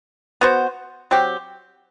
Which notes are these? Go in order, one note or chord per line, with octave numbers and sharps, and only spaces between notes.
B3 F#4 C5
F#3 C4 G4